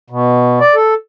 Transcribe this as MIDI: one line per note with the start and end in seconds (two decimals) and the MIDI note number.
0.10 0.59 47
0.61 0.75 74
0.75 0.94 69